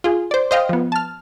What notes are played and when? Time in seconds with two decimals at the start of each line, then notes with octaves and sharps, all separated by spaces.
0.04 F4 G#4
0.31 C5 D5
0.51 C5 D#5 F5 G5
0.69 F3 B3
0.92 A5 F6